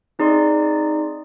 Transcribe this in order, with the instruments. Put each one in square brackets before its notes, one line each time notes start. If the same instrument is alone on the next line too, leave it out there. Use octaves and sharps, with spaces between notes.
[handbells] C4 D#4 G#4 D5 C6